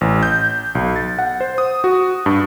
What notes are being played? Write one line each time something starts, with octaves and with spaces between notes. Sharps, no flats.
A1
G6
B1
A6
F#5
C5
D#6
F#4
G2